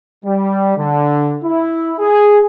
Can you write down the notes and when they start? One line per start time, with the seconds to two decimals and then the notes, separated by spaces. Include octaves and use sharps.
0.24 G3
0.77 D3
1.43 E4
1.99 G#4